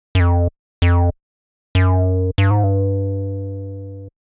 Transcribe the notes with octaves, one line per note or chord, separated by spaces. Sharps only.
F#2
F2
F2
F#2
G2
G#2
G2